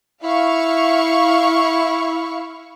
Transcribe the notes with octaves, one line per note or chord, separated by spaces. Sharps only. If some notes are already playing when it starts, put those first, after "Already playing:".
E4 F5 C#6